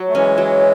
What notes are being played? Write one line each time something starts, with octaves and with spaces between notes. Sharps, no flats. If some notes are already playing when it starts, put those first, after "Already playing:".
Already playing: F#3
A3
E3 G#3 C#4
F#3